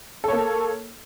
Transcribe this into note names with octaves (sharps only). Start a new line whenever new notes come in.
A#3 A4 C#5